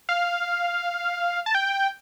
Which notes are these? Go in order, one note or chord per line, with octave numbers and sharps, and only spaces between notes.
F5
A5
G5